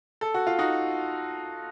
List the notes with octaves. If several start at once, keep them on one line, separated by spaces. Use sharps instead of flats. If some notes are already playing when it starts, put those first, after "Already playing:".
A4
F#4
F4
D#4 F#4